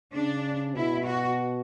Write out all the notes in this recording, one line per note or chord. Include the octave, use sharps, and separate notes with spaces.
C#3 D4
B2 E4
F#4